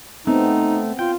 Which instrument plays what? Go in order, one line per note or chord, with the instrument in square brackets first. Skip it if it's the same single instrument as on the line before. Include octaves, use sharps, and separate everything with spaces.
[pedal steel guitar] A3 [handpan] B3 C4 [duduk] D#4
[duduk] F4 [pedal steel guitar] G5